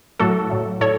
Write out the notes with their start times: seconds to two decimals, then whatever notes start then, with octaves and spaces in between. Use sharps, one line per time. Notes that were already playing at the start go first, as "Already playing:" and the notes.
0.19 A2 F#3 A3 F#4 A4
0.50 A2 F#3 A3
0.81 A2 A4 C#5